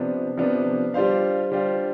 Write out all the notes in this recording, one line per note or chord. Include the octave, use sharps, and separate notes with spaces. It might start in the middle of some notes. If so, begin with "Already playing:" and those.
Already playing: C3 F3 B3 D4
C3 F3 B3 D4
G3 D4 F4 C5 F5
G3 D4 F4 C5 F5